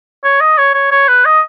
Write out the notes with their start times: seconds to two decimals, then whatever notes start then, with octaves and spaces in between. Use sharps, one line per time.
0.24 C#5
0.41 D#5
0.58 C#5
0.74 C#5
0.92 C#5
1.08 B4
1.25 D#5